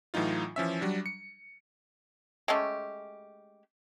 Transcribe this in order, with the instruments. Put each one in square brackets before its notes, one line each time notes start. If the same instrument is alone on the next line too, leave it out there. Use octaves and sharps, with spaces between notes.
[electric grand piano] A2 E3 F#3 D#4 F4
E3 F3 C#4 E5
F#3 G3 D4
C#7
[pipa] G#3 A3 C#4 G4